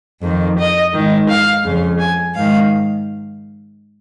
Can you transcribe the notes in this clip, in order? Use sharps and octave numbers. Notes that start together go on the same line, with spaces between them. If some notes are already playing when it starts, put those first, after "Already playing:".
F2 D#3
D#5
G#2 D#3
F5
F2 C#3
G#5
G#2 D#3 F5